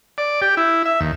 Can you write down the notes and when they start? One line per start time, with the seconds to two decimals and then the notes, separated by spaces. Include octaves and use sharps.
0.18 D5
0.42 G4
0.57 E4
0.85 E5
1.01 D#2